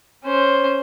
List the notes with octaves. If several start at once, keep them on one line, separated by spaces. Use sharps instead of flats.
C#4 C5